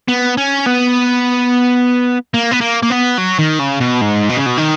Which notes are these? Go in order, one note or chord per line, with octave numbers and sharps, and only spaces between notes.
B3
C#4
B3
A#3
B3
A#3
A#3
B3
F#3
D#3
C#3
B2
G#2
B2
C#3
B2
D#3